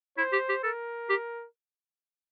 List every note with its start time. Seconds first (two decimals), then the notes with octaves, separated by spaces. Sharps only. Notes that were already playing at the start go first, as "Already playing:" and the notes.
0.18 E4 C5
0.33 G4
0.49 G4
0.63 A4 A#4
1.09 G4